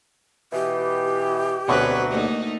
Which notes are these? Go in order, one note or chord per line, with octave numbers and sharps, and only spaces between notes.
B2 E3 G4
D2 B2 F#3 C4 D4 B4
A3 A#3 D#4